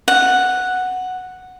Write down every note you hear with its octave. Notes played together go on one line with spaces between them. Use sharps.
F#5